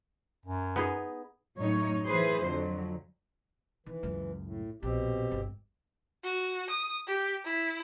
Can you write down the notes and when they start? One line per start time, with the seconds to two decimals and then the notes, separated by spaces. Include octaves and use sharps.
0.46 F#2
0.76 B3 D#4 G#4
1.58 F#2 A2 D#4 C#5
2.05 E3 G#4 B4 C5
2.45 F2 D3 F#3
3.86 D#3 E3
4.03 C#2 F#2
4.44 A2
4.83 A#1 B2 C4 G4
5.31 G1
6.24 F#4
6.70 D#6
7.07 G4
7.45 E4